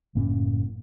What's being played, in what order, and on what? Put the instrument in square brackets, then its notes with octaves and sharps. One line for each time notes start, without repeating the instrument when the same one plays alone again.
[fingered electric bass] F#1 A2 A#3 C#4